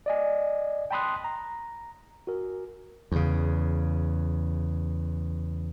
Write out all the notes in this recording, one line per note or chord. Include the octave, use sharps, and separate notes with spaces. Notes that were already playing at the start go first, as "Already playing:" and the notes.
D5 D#5 G#5
G5 A5 B5 C6 D#6 F#6
A#5
F#4 A#4
E2 C#3